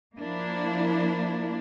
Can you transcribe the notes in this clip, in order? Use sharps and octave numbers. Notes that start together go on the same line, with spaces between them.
F3 A#3 D4 E4